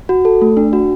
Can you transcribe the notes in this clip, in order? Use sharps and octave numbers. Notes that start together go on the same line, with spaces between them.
F#4
A4
A3
D4
F#4